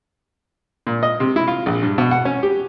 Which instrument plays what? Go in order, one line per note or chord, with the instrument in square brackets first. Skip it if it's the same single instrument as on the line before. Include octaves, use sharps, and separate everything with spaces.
[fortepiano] A#2
D#5
C3
E4
F4
A#1
G2
B2
F#5
C#4
G4